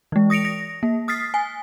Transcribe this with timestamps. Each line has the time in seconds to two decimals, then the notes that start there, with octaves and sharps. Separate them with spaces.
0.12 E3 G#3
0.30 D#6 A#6 C#7 D7 F7
0.45 A#6
0.83 A#3
1.08 D#6 F6 A6 B6 C7
1.34 G#5